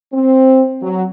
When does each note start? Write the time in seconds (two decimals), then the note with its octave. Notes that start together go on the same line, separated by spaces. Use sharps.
0.13 C4
0.82 F#3